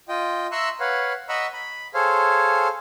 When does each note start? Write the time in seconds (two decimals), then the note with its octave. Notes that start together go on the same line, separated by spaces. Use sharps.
0.09 F4 D#5 G5
0.52 E5 A#5 C6 C#6 E6 F#6
0.80 B4 C#5 F5 F#5
1.29 D#5 F#5 A#5 B5 C#6 E6
1.53 B5
1.94 G#4 A4 C5 C#5 F5